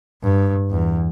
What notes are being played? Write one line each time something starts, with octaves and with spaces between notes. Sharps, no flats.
G2
E2